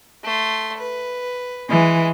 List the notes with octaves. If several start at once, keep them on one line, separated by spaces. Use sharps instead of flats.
A3 C6
B4
E3 G#3